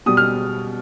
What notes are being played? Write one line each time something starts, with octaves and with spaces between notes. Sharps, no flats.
B2 G3 D#6
F6